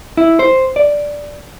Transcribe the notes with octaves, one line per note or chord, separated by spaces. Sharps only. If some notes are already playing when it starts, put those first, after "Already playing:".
E4
C5
D5